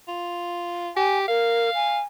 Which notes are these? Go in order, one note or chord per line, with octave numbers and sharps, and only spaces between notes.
F4
G4 G#5
A#4 F5
G#5